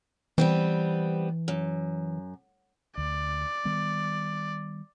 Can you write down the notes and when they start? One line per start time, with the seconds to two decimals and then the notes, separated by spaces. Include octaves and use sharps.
0.38 E3 G3 B3 C4
1.48 F#2
2.98 D2 D5
3.65 D#3 G3 B3